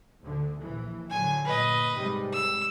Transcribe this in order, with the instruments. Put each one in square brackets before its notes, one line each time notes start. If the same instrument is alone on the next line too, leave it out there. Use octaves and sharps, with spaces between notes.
[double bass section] D2 D3
A#1 E3
[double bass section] A2 D3 F#3 [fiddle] G#5
[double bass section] G1 A#2 [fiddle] B4 D#5
[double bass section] G#2 C3 G3
[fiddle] E6